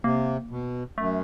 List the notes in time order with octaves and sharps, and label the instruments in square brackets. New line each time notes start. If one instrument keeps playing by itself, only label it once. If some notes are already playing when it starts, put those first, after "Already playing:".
[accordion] C3 [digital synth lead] A#3
[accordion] B2
[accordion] F#2 [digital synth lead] A3